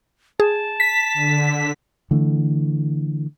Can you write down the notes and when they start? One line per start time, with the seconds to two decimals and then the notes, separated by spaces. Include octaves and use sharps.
0.40 G#4 A5
0.80 B6
1.14 D3
2.11 D3 E3 A3